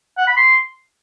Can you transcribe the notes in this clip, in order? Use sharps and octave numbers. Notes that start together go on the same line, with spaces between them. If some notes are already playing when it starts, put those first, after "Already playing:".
F#5
B5
C6